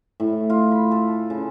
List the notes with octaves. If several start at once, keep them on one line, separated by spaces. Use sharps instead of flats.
A2
F4
B5
A4
C#3